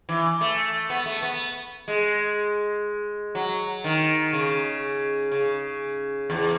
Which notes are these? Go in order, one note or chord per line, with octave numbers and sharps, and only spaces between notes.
E3
A3
B3
A3
B3
G#3
F#3
D#3
C#3
C#3
E2